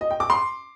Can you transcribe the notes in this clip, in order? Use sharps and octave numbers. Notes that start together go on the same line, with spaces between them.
D#5
G5
D6
C6